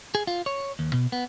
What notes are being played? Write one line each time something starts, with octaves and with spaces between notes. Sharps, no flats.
G#4
F4
C#5
D#2
B2
B3